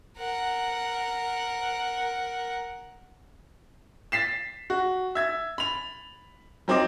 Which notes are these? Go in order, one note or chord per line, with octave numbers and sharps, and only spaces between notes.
A#4 F#5
A6 B6 C7 E7
F#4
E5 G#6
B5 F7
F#3 C4 D#4 D6